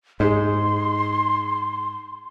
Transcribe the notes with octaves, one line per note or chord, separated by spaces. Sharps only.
G#2 D#4 G#4 C6